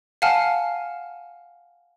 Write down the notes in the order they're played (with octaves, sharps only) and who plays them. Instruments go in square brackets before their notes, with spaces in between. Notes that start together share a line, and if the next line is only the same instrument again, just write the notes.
[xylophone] F5 F#5 G#5 A5 F6 C7